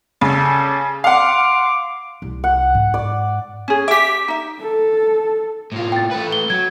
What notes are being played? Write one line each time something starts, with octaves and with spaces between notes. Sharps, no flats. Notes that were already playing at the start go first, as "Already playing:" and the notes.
C#3 G3 A4
F5 F#5 C6 D6
C2
F#5
G#2
D5
C#4 G#4
G4 E5 D6 B6
D#4 E5
A4
A2 F4
G5 A6
A3 B4
G7
F#3 G#6